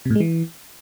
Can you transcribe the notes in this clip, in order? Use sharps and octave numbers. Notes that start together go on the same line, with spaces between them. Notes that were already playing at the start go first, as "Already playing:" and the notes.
C3
A2
G#3
E3